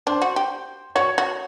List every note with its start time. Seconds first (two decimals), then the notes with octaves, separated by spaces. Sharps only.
0.07 D4 C5
0.22 F#4
0.36 G4
0.95 F#4 C#5
1.18 F#4